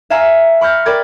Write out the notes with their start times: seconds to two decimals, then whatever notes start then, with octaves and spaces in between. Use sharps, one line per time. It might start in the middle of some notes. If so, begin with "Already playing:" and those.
0.10 E5 F5 G#5 A#5 E6
0.61 B5 C#6 F6 G6 A#6
0.86 A#4 D5 G5 B5 G#6 A6